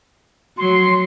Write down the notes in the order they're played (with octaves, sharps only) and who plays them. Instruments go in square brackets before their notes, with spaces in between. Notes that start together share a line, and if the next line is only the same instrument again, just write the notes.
[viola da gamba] F#3 [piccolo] C6